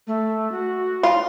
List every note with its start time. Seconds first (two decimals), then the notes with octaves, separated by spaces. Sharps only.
0.07 A3
0.52 F#4
1.03 F4